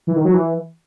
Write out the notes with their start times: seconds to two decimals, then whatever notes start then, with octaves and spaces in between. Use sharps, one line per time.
0.07 E3
0.16 D#3
0.25 F#3
0.33 E3